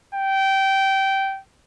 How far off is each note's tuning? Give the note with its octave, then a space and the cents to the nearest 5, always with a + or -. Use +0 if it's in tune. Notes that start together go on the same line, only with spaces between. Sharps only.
G5 -15